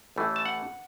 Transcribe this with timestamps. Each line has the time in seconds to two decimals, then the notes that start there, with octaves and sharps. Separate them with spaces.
0.16 A1 A2 E3 A3
0.36 A5
0.45 F#5